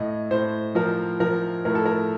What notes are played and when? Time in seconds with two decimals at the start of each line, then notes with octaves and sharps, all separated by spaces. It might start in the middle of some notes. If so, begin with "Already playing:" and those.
Already playing: A2 D#5
0.31 A2 C5
0.75 F3 A#4
1.20 F3 A#4
1.65 A2 A#4
1.75 A4
1.85 A#4